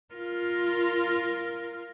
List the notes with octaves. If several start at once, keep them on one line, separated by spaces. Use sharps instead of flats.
F4 A#4